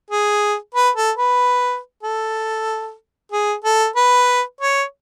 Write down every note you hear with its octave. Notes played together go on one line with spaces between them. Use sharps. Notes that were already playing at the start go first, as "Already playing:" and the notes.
G#4
B4
A4
B4
A4
G#4
A4
B4
C#5